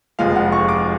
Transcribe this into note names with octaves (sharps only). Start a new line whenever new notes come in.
F1 F2 F3 G#3 F5
F#5
C#6
D6